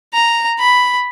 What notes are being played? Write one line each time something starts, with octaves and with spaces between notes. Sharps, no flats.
A#5
B5